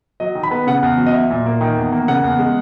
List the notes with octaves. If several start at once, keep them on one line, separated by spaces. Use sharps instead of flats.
F#3 D#5
D#3
B5
B3
C#3 F#5
E2
F#3
D#5
F#3 E5
A#2
A#3
D#3
E2
A#3
C#3 F#5
E2
G#3